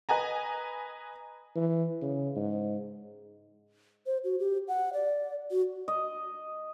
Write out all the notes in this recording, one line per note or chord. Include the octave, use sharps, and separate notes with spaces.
B4 D#5 G#5 A#5
E3
C#3
G#2
C5
F#4
G4
F#5
D5
F#4
D#5